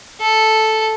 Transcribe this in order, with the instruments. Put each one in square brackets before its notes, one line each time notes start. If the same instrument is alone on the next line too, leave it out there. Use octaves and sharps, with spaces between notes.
[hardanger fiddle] A4